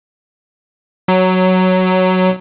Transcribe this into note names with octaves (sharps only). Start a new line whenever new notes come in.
F#3